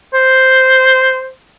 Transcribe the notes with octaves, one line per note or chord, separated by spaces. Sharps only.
C5